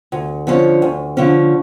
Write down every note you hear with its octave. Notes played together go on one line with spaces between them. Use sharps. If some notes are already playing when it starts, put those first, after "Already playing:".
D2
D3 F3 C#4
D2
D3 F3 C#4